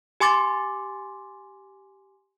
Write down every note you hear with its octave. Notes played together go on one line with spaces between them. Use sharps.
G4 G#5 C6 D6 A6